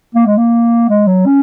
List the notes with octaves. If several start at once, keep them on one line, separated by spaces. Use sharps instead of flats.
A#3
G#3
A#3
G#3
F#3
C#4